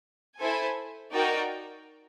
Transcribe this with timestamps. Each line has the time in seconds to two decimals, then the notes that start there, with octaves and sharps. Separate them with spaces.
0.39 E4 A4 C5 E5 G#5
1.12 D#4 F#4 A#4 D5 G5